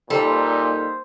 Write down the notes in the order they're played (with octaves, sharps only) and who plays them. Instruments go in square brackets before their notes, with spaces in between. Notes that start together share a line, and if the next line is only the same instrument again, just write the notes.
[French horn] A#2 [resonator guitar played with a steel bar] G3 A4 [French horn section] A#3 D#4 [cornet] C5